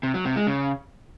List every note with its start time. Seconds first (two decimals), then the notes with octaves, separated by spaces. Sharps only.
0.03 C3
0.14 F#3
0.25 C3
0.36 G#3
0.47 C#3